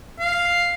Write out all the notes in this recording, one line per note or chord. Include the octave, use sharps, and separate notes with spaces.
F5